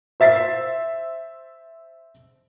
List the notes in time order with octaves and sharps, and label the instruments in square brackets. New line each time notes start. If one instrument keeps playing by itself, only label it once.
[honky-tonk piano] C5 E5 A6 B6 C7